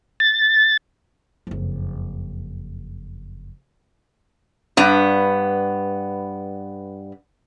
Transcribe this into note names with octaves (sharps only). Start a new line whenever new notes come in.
A6
F#1 F2
G2 B3